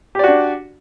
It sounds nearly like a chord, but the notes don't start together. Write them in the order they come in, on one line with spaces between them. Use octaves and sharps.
G4 D5 F#4 D4